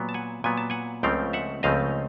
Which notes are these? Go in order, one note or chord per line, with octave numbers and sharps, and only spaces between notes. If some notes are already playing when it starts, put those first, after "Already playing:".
Already playing: A#2 F#3 B3
A5
F#5 G#5
A#2 F#3 B3 G#5
A5
F#5 G#5
C#2 C#3 F3 A3 C4 F5 G5
E5 F#5
C#2 C#3 F3 A3 C4 D#5 F5